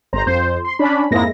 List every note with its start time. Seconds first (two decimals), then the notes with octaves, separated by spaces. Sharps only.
0.13 G1 C5 A#5
0.27 F2 C5
0.65 C6
0.79 C#4 D4 B5
1.11 F2 G#2 G#3 A#3 E4 A#6